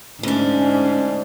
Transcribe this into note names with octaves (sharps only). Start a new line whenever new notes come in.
D2 G#2 C#4 D4